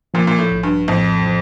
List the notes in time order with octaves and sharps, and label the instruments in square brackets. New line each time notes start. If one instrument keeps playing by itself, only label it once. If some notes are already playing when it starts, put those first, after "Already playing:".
[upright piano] A#2 [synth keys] F3
[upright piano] A#2
A2
[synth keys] A#1
[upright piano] G2
[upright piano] F2 [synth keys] A2
[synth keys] F3